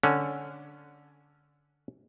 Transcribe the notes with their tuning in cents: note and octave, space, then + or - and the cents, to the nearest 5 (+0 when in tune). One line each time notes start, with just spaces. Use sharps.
D3 -5 C#4 +0